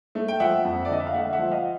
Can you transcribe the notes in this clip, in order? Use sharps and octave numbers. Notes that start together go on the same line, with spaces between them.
A3
G5
F3 E5 F#5
F2
D5
D3 D#5
E5
F5
A3 E5 F#5
E5 F#5
F3
D#5 F5